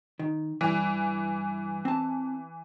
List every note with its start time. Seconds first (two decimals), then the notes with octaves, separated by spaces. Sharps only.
0.19 D#3
0.61 G2 E3
1.85 C4 A5